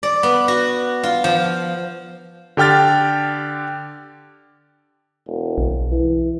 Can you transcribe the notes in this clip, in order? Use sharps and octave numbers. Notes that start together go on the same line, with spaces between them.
D5
B3
F#4
F4
F3
D3 G4 G5 F6 A6
E1
B1
E3